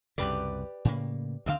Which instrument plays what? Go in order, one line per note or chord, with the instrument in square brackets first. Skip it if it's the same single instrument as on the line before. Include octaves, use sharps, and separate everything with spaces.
[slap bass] C2 F#2 C#3 [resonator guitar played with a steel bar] G4 B4 D5
[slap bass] A2 C#3 A#3
[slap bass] D2 D3 [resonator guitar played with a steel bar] C4 D#5 F5